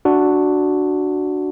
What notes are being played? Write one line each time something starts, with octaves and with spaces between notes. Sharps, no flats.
D4 F#4